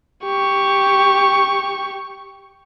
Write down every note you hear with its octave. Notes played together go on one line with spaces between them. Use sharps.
G4 C#6